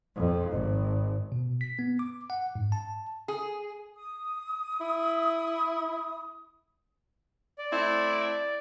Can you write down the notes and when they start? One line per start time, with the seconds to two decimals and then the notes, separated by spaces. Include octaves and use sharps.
0.16 F2
0.50 G#1
1.32 B2
1.61 B6
1.79 B3
1.99 D6
2.30 F#5
2.55 G#2
2.72 A5
3.28 G#4
3.96 D#6
4.80 E4
7.58 D5
7.71 A3 C4 E4